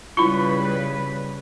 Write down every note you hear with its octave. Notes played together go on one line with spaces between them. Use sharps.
C#3 G3 E4 F4 B4 C#6